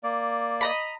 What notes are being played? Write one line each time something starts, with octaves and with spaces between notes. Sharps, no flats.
A#3 D5
D#5 A#5 B5